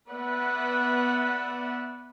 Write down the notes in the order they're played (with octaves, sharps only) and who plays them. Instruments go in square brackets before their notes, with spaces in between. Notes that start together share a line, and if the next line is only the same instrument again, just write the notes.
[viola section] B3 B4 D5 E5 F#5